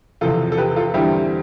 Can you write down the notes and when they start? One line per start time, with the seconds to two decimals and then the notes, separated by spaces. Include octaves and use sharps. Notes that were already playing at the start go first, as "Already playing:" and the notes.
0.21 E2 C3 F3 F4 A4
0.52 A4
0.58 G4 B4
0.76 F4 A4
0.94 E2 D3 G3 C4 E4 G4